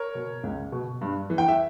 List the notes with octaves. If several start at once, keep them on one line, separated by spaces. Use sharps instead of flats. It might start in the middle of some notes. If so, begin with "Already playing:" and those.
Already playing: A#4 C#5
B2
C#2
B2
G2
E3
G5
E5